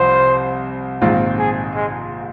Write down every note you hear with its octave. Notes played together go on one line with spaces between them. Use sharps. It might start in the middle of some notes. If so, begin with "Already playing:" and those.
Already playing: C2 F3 C4 C5
A#1 G#2 D#3 C4 F4
G#4
G#3